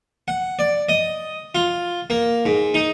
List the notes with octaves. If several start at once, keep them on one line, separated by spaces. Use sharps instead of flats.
F#5
D5
D#5
F4
A#3
G#2
D#4